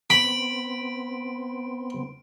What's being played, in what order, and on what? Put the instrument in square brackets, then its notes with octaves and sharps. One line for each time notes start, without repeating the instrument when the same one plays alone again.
[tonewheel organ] B3 C4 [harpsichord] B5 [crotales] D7